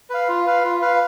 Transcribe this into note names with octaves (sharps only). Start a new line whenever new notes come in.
B4 F5
F4
B4 F5
F4
B4 F5